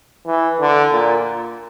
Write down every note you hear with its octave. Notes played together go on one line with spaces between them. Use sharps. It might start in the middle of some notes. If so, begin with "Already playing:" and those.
E3
D3
A#2